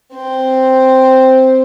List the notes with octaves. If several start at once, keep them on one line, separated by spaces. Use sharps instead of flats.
C4 C5